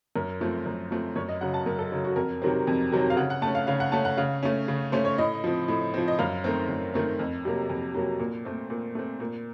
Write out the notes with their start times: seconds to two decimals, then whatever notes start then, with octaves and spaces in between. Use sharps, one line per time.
0.15 F#2 A#4
0.40 F3 A3 C4
0.66 F#2
0.91 F3 A3 C4
1.16 F#2 C#5
1.28 D#5
1.41 C#3 F#3 F#5
1.54 A5
1.66 F#2 A#4
1.79 A4
1.92 C#3 F#3
2.04 F#4
2.16 F2 A#4
2.42 C3 D#3 F#3 C4
2.67 F2
2.92 C3 D#3 F#3 C4
3.10 F5
3.16 C#3 F#5
3.30 F#5
3.42 A3 A5
3.47 C#4
3.55 F5
3.67 C#3 F5
3.80 F#5
3.92 A3 C#4 A5
4.05 F#5
4.17 C#3 F5
4.43 A3 C#4
4.68 C#3
4.92 A3 C#4 C5
5.05 C#5
5.18 A2 D#5
5.44 F3 C4
5.68 A2
5.94 F3 C4
6.08 D#5
6.19 F#2 F5
6.44 D#3 A3 C4
6.69 F#2
6.94 D#3 A3 C4
7.19 F2
7.45 C3 F#3 A#3
7.70 F2
7.94 C3 F#3 A#3
8.19 A#2
8.45 A3 C4
8.70 A#2
8.95 A3 C4
9.20 A#2